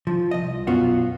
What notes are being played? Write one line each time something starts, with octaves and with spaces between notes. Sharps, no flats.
F3
C2 D#5
B1 F#2 B3 F4 F#4